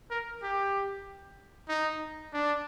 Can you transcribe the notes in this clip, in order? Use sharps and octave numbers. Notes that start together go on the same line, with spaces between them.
A#4
G4
D#4
D4